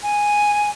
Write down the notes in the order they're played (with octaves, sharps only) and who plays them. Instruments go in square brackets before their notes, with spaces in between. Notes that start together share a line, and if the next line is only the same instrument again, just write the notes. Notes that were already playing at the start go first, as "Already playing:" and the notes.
[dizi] G#5